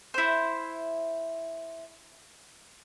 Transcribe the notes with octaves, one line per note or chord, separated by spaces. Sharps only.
E4 C5